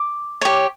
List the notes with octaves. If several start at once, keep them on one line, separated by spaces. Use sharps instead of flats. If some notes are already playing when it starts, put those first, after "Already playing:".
Already playing: D6
G4 C#5